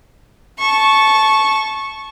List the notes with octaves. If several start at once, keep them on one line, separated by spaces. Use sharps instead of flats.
A5 C#6